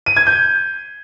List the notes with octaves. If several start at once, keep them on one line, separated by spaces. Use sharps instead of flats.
D#7
G#6
G6